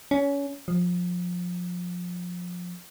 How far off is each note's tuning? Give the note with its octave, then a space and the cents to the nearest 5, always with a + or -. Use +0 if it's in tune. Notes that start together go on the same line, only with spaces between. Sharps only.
C#4 +25
F3 +25